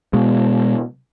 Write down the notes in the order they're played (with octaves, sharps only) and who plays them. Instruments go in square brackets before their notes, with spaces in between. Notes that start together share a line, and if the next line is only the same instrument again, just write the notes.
[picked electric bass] B2 G#3